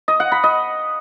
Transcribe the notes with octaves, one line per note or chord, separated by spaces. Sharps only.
D#5
F#5
B5
D#5